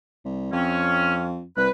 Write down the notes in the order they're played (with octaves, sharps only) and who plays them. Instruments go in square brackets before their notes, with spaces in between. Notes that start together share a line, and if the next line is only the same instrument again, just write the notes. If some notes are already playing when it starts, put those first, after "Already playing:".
[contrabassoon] C2
[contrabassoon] F2 [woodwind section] C4 C#4
[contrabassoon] C2 [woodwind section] B4